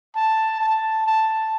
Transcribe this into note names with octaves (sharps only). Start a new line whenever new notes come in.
A5
A5
A5